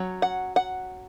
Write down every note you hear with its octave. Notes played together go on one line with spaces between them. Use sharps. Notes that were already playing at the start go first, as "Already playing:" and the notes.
Already playing: F#3 C#4
F#5
F#5